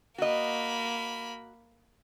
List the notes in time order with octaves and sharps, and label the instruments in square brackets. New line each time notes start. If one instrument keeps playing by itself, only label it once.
[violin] A#3 B5 [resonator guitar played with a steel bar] F#4 D#5